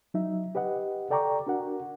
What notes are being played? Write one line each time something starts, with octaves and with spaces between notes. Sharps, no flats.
F#3 D#4 E5
G4 B4 D#5 F#5
A4 D5 G5 A#5 C#6 D6
D4 F#4 A#4 F#5